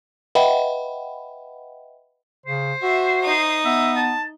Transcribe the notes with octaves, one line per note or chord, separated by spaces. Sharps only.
B4 D#5 E5 F#5 G5 B5
C#3 C5
F#4 E5
D#4 D#6
B3 E5
A5